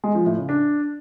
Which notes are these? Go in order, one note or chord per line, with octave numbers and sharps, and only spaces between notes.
G#3
F3
A2
C#3
D4